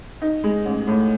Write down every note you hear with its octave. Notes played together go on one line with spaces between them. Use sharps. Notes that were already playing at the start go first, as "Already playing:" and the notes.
D#4
G#3
A1
A2